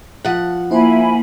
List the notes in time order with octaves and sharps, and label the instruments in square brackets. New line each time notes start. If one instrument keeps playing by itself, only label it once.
[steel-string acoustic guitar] F3 F#5
[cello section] A#3 [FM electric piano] E4 C5 [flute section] E5 G#5 B5